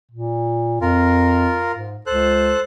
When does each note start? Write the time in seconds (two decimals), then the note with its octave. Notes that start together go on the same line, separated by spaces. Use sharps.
0.11 A#2
0.81 F2 F4 A#4
1.74 G#2
2.06 C#2 A4 C5 F#6